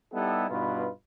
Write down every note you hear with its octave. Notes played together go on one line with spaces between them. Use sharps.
G3 B3 D#4 E4 G4 A4
G2 B2 D#4 F4 B4